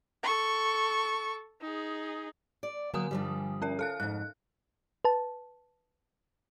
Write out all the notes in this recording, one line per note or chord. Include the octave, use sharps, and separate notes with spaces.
A4 C#6
D#4 G#4
D5
D3 F#3 A#3 G#5 D#6
G2 F3 G3
C#4 A#4 E5
A4 F5 F#6
F2 G#2 F#6
B4 A5